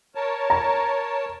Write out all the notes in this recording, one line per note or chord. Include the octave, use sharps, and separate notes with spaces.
A#4 C#5 A5
A#5